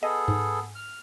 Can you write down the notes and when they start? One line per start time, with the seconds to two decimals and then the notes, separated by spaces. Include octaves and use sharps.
0.03 B3 G#4 A4 D#5
0.28 G#2
0.75 F6